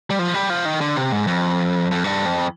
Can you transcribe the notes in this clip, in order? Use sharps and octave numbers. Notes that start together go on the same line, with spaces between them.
G3
F3
G3
F3
D#3
D3
C3
G#2
F2
F2
G2
F2